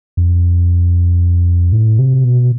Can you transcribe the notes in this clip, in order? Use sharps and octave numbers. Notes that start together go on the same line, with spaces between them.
F2
A2
C3
B2